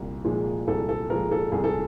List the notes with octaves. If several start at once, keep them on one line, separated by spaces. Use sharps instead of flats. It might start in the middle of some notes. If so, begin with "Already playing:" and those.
Already playing: C2 A#2
A#2 F3 G#3
C2 A4
A4
A#2 F3 G#3 A#4
A4
C2 G#4
A4